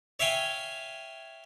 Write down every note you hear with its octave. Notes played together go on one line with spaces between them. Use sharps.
C#5 E5 F5 G5 G#5